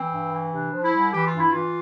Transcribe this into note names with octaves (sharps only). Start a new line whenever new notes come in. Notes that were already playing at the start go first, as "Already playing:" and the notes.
Already playing: E3 C4
G2
E3
C3 D4
F3
E4
C2
E3 G4
F4
G2 E4
E3 F4